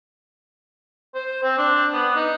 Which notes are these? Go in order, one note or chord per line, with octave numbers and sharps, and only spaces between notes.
C5
C4
D4
B3
D#4